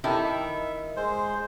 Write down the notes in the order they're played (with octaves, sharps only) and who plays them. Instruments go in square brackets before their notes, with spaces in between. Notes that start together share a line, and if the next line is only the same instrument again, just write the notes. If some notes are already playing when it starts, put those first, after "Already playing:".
[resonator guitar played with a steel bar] D#3 D#4 E4 [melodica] G4 A4
[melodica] E5
G#3 C5